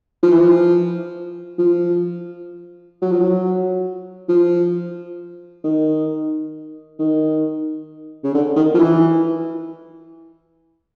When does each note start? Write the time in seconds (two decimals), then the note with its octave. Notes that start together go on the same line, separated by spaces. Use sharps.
0.23 F3
0.31 E3
0.40 F3
1.58 F3
3.02 F#3
3.11 F3
3.19 F#3
4.28 F3
5.64 D#3
6.99 D#3
8.24 C#3
8.34 D3
8.56 D#3
8.74 F3
8.79 E3